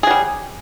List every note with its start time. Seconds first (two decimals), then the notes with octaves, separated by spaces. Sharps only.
0.03 G#4
0.07 F#3
0.10 G3